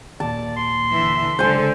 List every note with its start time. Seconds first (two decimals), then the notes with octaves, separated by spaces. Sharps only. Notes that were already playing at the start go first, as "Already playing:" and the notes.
0.20 D#2 A#2 D5 A5
0.57 C6
0.91 D3 E3 E5
1.39 C#2 D3 F#3 A4 C5 G#5